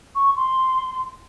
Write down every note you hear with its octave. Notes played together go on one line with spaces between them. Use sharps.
C#6
C6